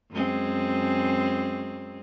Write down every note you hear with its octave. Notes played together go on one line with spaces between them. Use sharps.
F#2 G#3 C4